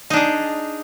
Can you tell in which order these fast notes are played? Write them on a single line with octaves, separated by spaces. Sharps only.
D#4 D4 G#4